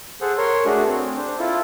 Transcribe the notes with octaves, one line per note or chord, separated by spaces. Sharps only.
G#4 A4 C5 F#5
A#4 C#5 C6
A3 D4 F#4 G#4
C4
D4 C5
E4 F4 A4